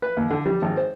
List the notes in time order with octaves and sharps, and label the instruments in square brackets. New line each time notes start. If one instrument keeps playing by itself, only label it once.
[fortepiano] B4
D#2
D3
G3
G#1
C5